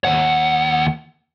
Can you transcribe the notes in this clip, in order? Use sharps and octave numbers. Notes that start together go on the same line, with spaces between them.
D#2 F#5